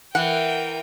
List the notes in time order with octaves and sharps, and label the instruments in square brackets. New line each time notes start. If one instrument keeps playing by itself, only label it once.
[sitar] E3 [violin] A#4 G5 [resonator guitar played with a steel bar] F#5